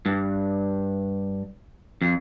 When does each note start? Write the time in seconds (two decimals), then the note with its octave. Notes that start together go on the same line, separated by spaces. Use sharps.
0.06 G2
2.02 F2